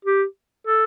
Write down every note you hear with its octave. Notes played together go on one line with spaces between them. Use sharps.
G4
A4